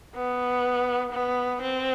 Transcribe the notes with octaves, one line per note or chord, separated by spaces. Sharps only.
B3
B3
C4